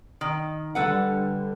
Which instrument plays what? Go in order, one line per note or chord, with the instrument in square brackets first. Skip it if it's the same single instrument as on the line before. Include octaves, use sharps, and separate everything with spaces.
[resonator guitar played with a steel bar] D#3
[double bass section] D3 G3 [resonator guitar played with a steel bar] A4 B4 F#5